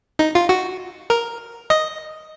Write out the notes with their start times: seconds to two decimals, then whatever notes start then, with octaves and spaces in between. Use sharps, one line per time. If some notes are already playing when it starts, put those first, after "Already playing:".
0.19 D#4
0.35 F4
0.49 F#4
1.10 A#4
1.70 D#5